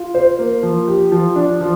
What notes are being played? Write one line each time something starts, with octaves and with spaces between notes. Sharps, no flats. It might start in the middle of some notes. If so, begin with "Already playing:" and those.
Already playing: F4
C5
A#3
F3
G4
F3
D4
F3